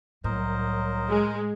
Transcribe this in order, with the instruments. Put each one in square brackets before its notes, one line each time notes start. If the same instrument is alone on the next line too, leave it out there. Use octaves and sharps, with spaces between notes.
[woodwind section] C2 F#3 [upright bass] A2 [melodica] A#4 C5 D#5
[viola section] G#3